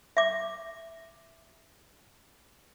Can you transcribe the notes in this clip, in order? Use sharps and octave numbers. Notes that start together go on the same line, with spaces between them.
E5 D6